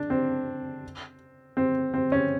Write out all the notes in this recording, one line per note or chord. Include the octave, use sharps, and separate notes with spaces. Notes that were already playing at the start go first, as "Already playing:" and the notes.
Already playing: D4
C4
C4
C4
C#4